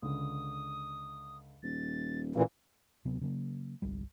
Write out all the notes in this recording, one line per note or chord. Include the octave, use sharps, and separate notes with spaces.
C#2 D3 D#6
D#1 A6
A1 A#2 E3 F5
D1 C3 F#3 B3
C#3 F#3 G#3 A#3
G1 C2 G3